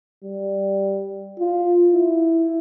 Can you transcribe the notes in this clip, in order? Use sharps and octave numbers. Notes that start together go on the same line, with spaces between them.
G3
F4
E4